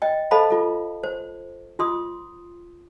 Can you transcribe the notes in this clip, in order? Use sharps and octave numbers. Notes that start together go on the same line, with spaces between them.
D#5 G5
A4 C5 D#5 F5 A5 B5
F4 A4
C5
F4 C6 D#6